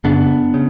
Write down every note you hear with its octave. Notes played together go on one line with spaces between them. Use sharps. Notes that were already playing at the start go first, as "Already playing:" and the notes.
F#2 C#3 B3 D4
C#3